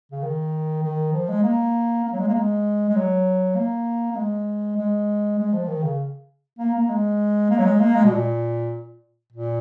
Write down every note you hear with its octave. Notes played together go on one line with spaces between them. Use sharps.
C#3
D#3
D#3
F3
G#3
A#3
A#3
F#3
G#3
A#3
G#3
G#3
F#3
A#3
A#3
G#3
G#3
G#3
F3
D#3
C#3
A#3
A#3
G#3
A#3
F#3
G#3
A#3
G#3
B2
A#2
A#2